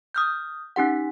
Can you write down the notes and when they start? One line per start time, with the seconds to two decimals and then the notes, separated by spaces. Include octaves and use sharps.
0.15 D#6 F6 G6
0.76 C#4 D#4 G4 F#5